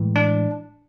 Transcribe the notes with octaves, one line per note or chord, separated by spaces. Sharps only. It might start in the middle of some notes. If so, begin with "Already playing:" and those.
Already playing: A2 E3 G#3
D4